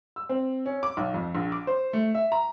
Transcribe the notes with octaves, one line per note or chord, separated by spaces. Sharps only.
E6
C4
C#4
D6
B1
F2
A#1
D6
C5
A3
E5
A#5